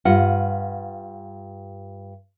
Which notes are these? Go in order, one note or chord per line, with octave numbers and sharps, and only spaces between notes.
G2 F4 F#5